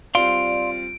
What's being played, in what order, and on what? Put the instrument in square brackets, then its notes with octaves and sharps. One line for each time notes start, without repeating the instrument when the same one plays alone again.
[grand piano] G3 C4 F4 [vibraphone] D5 [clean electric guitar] F5 C6 [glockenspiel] D7